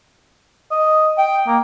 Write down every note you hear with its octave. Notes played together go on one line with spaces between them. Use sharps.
D#5
G5
A#3